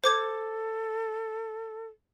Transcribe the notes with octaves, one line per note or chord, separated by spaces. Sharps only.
A4 C5 D6 G#6